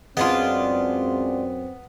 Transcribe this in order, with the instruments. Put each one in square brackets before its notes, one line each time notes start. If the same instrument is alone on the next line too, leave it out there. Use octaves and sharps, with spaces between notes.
[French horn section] F#2 C4 [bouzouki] G#3 D4 F4 [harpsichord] B3